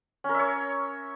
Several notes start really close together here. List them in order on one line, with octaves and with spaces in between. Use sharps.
C#4 A#4 E5 C#5